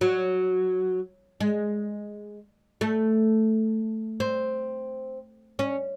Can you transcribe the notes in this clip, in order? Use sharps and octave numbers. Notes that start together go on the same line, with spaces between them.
F#3
G#3
A3
C4
C#4